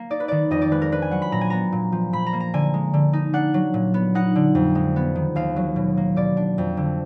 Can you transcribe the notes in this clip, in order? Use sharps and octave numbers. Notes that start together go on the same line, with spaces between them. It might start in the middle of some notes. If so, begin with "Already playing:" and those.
Already playing: A#3
D#4 D5
B4
D#3 D5
F2 D#5
D5
G#3 B4
A#4
D4 B4
G#5
F#3 F#5
B5
A#2 A#5
G#5
B3 A#5
A#2
F3
A#2 B5
A#5
A#3
A#5
D3 G#5
G#3
D3
D#4
D4 F#5
F#3
A#2
B3
D#4 F#5
D3
F2
G#3
B3
D#3
D#2 F5
F#3
B2
A#3
B2 D5
D4
F2
D3